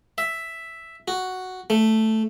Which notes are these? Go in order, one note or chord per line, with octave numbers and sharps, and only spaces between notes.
E5
F#4
A3